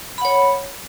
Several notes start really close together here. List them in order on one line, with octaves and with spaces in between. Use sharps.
B5 F#5 C#5